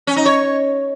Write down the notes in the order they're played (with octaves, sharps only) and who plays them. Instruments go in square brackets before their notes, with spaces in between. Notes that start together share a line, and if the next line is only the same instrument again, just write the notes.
[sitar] C#4
D#4
C#5